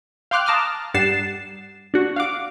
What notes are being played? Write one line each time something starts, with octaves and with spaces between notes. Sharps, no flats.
F5 G5 C6 D6 F6 F#6
A5 A#5 D6 D#6 F6
G2 G3 F#5 A6 C7 E7
D4 F#4
F5 F#5 D6